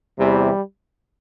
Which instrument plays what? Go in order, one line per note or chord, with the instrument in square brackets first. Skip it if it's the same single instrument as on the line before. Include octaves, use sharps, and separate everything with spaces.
[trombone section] E2 C3 E3 G3